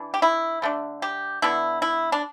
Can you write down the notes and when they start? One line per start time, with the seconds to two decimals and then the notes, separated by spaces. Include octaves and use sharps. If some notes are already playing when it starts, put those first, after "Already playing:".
Already playing: E3 D4
0.14 G4
0.22 E4
0.62 D3 A3 D4
1.02 G4
1.42 D3 B3 D4 E4
1.82 E4
2.12 D4